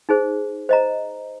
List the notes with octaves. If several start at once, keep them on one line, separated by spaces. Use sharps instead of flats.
D#4 G#4 C5
C5 D#5 A#5